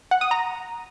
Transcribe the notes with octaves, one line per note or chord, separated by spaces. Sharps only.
F#5
D#6
A#5